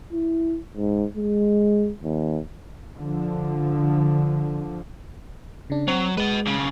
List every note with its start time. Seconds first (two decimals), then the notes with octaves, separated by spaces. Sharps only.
0.13 E4
0.77 G#2
1.17 G#3
2.03 D#2
2.97 D3 F3
5.70 C#3 D4
5.88 F#3 C4
6.17 G#3 B4 D#5
6.46 B1 C#3